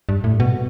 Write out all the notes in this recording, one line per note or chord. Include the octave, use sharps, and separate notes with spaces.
G2
A2
B2